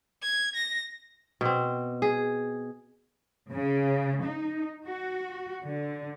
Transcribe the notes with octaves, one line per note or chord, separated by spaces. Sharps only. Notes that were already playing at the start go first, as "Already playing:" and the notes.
G#6
A#6
B2 C4
G#4
C#3
D#4
F#4
D3